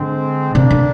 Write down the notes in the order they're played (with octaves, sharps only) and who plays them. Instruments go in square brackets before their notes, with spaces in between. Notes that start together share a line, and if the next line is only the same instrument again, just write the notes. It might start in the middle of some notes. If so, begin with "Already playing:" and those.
Already playing: [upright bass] D3 [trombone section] G#3 C4
[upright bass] C3 [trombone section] A#3 D4
[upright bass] D3